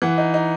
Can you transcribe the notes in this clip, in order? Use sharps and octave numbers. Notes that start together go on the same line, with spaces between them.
E3 F#5
D#4
D#4